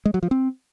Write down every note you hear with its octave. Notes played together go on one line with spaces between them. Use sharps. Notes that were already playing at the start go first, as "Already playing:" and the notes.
G#3
F#3
F3
C4